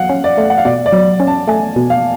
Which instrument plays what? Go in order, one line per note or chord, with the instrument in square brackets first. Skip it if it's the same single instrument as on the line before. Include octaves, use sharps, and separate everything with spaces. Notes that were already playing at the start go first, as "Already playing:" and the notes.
Already playing: [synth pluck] F#3 [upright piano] F5 F#5
[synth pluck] C#4
[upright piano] D5
[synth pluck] A3
[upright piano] F#5
F5
[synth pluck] B2 [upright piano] D5
[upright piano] D5
[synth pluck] F#3
C#4
[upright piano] A5
[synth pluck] A3 [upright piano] G#5
[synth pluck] B2
[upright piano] F5